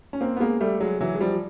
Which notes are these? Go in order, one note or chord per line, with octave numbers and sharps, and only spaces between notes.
C#4
A#3 C4
B3
G#3 A#3
G3 A3
F#3 G#3
E3 F#3
G#3
F3 G3